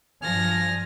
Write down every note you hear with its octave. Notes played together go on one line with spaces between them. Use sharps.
G2 F3 G#5 F6 A#6